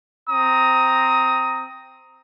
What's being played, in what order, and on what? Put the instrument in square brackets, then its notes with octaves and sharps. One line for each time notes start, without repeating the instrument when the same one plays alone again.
[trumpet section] C4 A#5 D#6